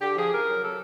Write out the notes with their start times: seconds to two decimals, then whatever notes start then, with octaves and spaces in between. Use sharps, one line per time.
0.01 D3 G4
0.16 F3 G#4
0.32 C#3 A#4
0.46 F#3
0.61 C#3 A4